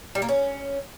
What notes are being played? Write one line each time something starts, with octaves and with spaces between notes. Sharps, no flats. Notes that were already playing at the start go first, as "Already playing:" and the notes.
G3
A#3
C#4